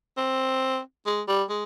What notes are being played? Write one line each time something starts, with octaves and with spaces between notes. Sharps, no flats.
C4
G#3
G3
G#3